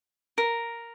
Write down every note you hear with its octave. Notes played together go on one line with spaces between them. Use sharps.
A#4